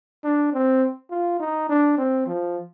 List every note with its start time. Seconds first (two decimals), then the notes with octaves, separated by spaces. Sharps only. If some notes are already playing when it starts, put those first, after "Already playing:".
0.24 D4
0.54 C4
1.11 F4
1.40 D#4
1.69 D4
1.98 C4
2.27 F3